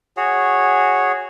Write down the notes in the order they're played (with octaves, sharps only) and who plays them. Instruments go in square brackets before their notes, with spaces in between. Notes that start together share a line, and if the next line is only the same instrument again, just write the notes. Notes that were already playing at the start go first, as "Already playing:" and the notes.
[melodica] F#4 G#4 C#5